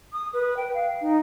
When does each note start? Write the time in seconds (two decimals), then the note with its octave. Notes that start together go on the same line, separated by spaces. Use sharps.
0.13 D#6
0.33 B4
0.57 G5
0.74 F5
1.01 D#4